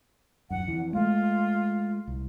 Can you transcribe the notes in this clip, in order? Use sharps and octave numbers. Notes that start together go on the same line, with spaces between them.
D#1 F#2 F#5
F2 E3
G#3 A3 F4
C2